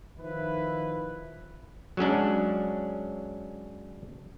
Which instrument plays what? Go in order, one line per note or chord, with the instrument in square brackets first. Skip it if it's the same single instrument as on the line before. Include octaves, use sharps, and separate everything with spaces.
[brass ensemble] D#3 F3 E4 B4
[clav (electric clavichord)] F#3 G#3 C#4 D4